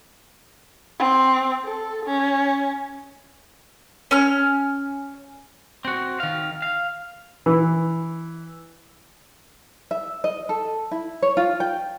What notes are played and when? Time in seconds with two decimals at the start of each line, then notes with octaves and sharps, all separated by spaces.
0.99 C4
1.65 A4
2.05 C#4
4.11 C#4 F6
5.85 C4 F#4
6.20 D#3 F5
6.62 F5
7.46 E3
9.91 E5
10.24 D#5
10.49 A4
10.91 E4
11.22 C#5
11.37 F4
11.60 G5